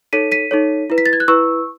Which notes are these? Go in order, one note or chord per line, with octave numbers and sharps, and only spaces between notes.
D#4 A4 C#5 B6 D#7
B6 D#7
D#4 A4 C#5
E4 B4
B6
A6
G#6
F#6
E4 B4 C#6 E6